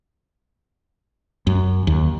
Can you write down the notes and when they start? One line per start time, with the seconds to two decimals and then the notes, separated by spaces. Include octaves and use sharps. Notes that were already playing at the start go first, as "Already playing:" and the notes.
1.47 F#2
1.87 D#2